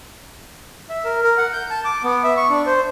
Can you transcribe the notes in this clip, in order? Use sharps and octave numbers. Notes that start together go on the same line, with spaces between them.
E5
A#4
A#4
F#5
G6
A5
D6
B3
E5
C#6
D4
C5